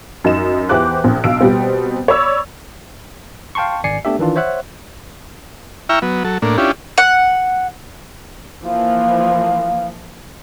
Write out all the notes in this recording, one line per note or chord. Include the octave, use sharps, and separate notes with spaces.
F#2 D#4 E7
E2 E3 G4 C5 D6 F#6
A#1 C4
B1 F5 E6 D7
B2 G3 C4
C#5 D5 B5 E6
F5 G5 A5 C6 C#6
G#1 D5 G#5 C7 C#7
A3 B3 D4 G4 E5
D#3 E3 D4 F4
C5 C#5 E5 F#5 F#6
E4 E5 G5 A#5 C#6 F6
F#3 B3
F#3 A4
A2 A#3 D4
C#4 D4 E4 F4 G4
F#5
E3 F3 A#3 F5